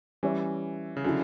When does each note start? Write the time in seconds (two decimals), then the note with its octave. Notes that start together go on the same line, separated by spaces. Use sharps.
0.23 E3 G3 C#4 G4 C#5 E5
0.97 C#3
1.04 D3 F#3 C#4 E4